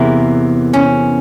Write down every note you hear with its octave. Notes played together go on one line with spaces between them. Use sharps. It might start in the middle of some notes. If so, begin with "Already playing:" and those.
Already playing: E2 C3 E3 A#3
C#4